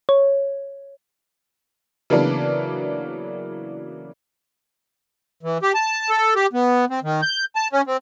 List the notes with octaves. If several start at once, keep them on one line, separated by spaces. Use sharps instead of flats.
C#5
C#3 E3 F#3 A#3 B3 D4
E3
G4
A5
A4
G4
B3
C4
D#3
G6
A5
C#4
C4